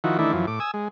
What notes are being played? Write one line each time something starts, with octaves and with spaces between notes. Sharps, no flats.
D#3 F3 E4 F#4
D#3 E3 A3 D4 E4
F#2 E3 F3
A2 D6
G#5 D#6 E6
G#3